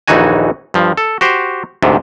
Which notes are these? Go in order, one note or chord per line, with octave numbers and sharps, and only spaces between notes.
A#1 D#2 E3 D#4 F#4 G#5
G2 F3
A4
F#4 G4 C5
D2 G#2 C3